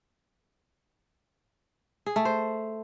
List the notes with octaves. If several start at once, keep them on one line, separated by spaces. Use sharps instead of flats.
G#4
A3
C5